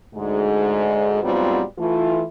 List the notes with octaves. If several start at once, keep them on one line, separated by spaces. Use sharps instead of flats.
D2 G#2 G#3
G#2 F#3 G3 B3 C4 F4
E3 A3 F4